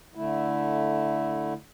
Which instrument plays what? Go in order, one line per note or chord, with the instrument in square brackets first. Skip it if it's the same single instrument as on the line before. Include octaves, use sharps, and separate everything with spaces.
[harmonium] D3 A3 E4